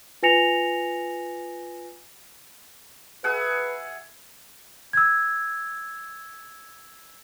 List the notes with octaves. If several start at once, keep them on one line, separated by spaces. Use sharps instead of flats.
F4 B4 G#5 A#6 C#7 F7
G#4 B4 E5 F#5
E6 G#6